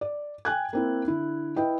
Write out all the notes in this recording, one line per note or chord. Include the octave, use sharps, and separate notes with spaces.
D5
G5 G#5 F#6 G#6
A#3 C4 E4
D3 E4
E4 B4 D#5 G5